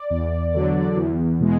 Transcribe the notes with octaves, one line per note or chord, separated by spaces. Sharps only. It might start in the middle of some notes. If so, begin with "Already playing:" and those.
Already playing: D5
E2
D3 F#3
E2
B2 G#3